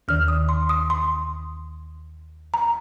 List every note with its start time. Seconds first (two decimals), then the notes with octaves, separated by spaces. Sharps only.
0.08 D#2 D#3 F6
0.28 D#6
0.49 C6
0.69 D#6
0.90 C6
2.54 A#5